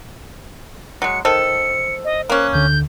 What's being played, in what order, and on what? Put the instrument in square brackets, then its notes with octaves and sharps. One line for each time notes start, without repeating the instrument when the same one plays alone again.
[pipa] F#3 G#3 [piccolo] C#7
[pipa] D#3 A4 [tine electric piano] C5 [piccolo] C#7
[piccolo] D#5
[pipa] A#3 C#4 [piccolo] F#6
[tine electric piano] D2 D3 [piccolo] G6